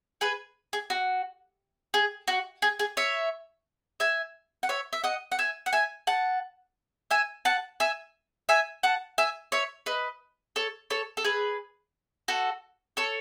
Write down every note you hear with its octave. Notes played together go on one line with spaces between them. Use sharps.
G#4 B4
G#4
F#4
G#4
F#4
G#4
G#4
C#5 E5
E5 G#5
F#5
C#5 E5
E5
D#5 F#5
F#5
E5 G#5
F#5
E5 G#5
F#5 A5
E5 G#5
F#5 A5
E5 G#5
E5 G#5
F#5 A5
E5 G#5
C#5 E5
B4 D#5
A4 C#5
A4 C#5
A4
G#4 B4
F#4 A4
A4 C#5